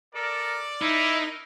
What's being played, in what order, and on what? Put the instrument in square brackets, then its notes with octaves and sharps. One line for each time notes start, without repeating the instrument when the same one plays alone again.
[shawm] A4 [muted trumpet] A#4 [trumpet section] D5
[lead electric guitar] D#4 [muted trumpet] E4 [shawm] A#4